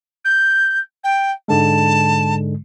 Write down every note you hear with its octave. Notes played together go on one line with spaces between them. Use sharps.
G6
G5
G#2 D3 G#3 A5